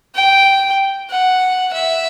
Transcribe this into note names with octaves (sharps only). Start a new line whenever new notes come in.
G5
F#5
E5